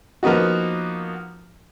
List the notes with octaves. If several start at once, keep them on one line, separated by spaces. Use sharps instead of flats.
F3 A#3 B3 D#4 F#4